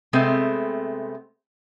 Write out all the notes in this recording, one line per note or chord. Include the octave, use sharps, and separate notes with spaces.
C3 G#3 A3 B3 C4